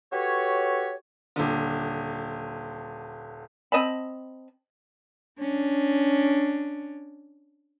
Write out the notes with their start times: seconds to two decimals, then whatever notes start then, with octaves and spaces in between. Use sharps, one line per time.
0.13 F#4 G4 A4 B4 C#5
1.36 D#1 D3
3.72 C4 D#5 A5 B5
5.39 C#4 D4